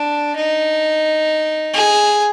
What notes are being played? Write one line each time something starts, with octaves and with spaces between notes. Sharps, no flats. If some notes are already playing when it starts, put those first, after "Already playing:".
Already playing: D4
D#4
G#4